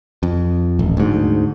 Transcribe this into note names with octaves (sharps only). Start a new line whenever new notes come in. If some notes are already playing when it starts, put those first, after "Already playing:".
F2
D#1 A1
D2 G#2